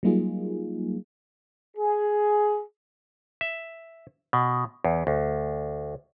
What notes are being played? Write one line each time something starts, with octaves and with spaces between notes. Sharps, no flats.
F#3 G3 A#3 D#4 F4 G#4
G#4
E5
B2
E2
D2